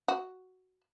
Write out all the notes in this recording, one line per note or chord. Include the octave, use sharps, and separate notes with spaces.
F#4